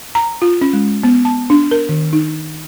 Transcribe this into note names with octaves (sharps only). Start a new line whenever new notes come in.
A#5
F4
C#4
G#3
B3
A5
D4
A#4
D#3
D#4